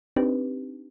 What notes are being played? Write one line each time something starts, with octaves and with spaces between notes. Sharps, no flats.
C4 D4 D#4 G4 B4